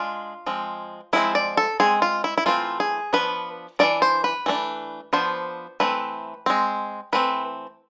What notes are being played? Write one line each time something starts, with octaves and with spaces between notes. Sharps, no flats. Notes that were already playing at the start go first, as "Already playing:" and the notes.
Already playing: G#3 D4 F4
F3 G#3 C4
F3 G#3 C4 E4
D5
A4
G#3 C4 G#4
F4
E4
E4
E3 A3 C4 F4
G#4
F3 B3 D4 B4
E3 A3 D4 D5
C5
B4
E3 A3 D4
F3 B3 D4 C5
E3 A3 C4 B4
G#3 C4
E3 A3 C4 B4